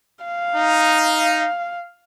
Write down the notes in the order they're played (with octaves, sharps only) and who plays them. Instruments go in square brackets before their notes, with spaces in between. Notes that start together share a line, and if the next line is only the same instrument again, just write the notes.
[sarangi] F5
[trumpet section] D#4